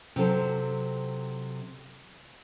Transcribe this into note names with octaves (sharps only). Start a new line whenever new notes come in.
C3 F#3 A4 C5